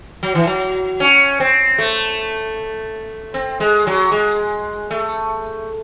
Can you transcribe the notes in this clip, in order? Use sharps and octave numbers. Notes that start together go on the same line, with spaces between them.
F#3
E3
F#3
C#4
C4
A3
C4
G#3
F#3
G#3
A3